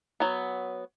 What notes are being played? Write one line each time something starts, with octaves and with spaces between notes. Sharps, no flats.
F#3 B3